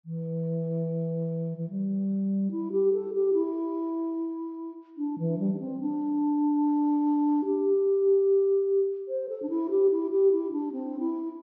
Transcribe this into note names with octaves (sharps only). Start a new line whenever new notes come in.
E3
E3
G3
E4
G4
A4
G4
E4
D4
E3
G3
D4
C4
D4
G4
C5
A4
D4
E4
G4
E4
G4
E4
D4
C4
E4